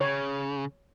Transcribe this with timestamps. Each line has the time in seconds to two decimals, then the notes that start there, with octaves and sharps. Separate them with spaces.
0.01 C#3 C#5